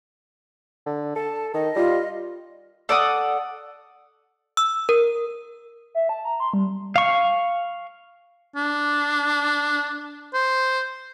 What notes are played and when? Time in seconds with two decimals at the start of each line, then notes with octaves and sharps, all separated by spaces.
0.86 D3
1.16 A4 A5
1.54 D#3 D#5
1.76 G3 F4
2.89 A4 D5 F#5 D#6
4.57 E6
4.89 A#4
5.95 E5
6.09 A5
6.25 A#5
6.40 C6
6.53 G3
6.96 F5 C#6
8.56 D4
10.33 C5